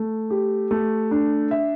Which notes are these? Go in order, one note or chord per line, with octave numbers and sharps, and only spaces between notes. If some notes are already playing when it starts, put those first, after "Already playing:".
Already playing: A3
G4
A3
D4
E5